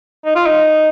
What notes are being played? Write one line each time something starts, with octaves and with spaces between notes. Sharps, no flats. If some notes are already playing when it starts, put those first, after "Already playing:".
D#4
F4
D#4